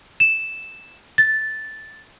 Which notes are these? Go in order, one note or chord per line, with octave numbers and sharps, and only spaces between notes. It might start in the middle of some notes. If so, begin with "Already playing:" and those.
E7
A6